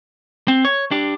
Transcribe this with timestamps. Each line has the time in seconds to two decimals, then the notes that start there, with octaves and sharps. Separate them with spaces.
0.48 C4
0.65 C#5
0.91 D4 G4